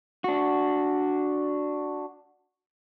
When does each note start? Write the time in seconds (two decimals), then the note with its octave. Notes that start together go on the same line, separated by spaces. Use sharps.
0.24 D4 F#4